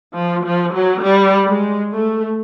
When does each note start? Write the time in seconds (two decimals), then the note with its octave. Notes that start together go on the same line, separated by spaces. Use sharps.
0.15 F3
0.45 F3
0.74 F#3
1.03 G3
1.47 G#3
1.92 A3